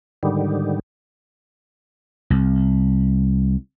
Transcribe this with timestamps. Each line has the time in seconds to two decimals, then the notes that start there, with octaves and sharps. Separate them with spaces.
0.23 G#2 D3 D#3 G3
2.30 C2